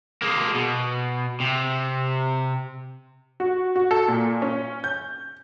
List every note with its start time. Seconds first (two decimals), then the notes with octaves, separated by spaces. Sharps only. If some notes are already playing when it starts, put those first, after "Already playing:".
0.22 G#3 A#3
0.55 B2
1.40 C3
3.40 F#4
3.76 F#4
3.91 A4
4.08 A#2
4.42 C#4
4.84 G6